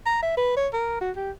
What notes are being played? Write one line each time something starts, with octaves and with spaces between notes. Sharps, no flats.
A#5
E5
B4
C#5
A#4
F#4
G4